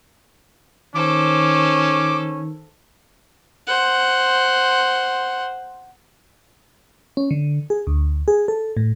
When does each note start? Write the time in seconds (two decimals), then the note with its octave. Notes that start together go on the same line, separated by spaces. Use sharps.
0.95 D#3 C#4 A4 C5 D6
3.67 C5 F#5
7.17 C#4
7.31 D3
7.70 G#4
7.87 D2
8.28 G#4
8.48 A4
8.77 A2